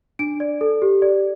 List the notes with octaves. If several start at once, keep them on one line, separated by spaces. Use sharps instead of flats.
D4 D7
D5
A4
G4
D5